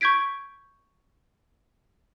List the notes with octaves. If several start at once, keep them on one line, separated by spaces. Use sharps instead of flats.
C#6 G6 G#6 B6 D7